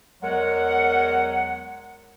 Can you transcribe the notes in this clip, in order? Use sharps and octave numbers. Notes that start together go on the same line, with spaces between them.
E2 F#3 G#3 A#4 F#5